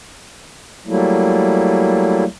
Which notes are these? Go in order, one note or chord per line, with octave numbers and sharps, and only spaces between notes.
F#3 G3 A3 A#3 E4